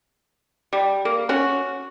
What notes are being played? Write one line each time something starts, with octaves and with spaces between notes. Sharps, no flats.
G3
A#3
C#4 F#4